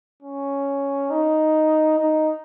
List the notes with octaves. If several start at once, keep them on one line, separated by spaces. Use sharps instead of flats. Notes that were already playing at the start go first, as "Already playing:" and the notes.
C#4
D#4
D#4